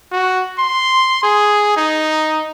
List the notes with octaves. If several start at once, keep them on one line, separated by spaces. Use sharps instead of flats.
F#4
C6
G#4
D#4